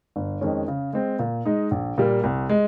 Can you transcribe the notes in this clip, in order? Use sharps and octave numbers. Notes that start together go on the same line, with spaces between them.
G1
F2 D#3 G#3 C#4
C#3
G#3 C4
A#2
G#3 D#4
A#1
A#2 G3 A#3
C2
G#3